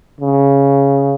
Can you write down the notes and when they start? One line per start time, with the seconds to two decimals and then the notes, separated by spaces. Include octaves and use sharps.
0.20 C#3